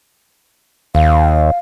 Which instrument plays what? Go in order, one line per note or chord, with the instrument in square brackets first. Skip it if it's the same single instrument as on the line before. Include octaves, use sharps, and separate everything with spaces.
[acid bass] D#2 [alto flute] F5